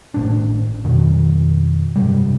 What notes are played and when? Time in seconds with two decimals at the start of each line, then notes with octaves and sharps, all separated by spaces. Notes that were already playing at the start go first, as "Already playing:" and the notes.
0.14 G#1 A2 D4
0.84 F2 B2 D#3
1.96 G2 C3 G3